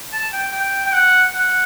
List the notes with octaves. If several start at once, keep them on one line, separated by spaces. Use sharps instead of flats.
A5
G5
G5
G5
F#5
F#5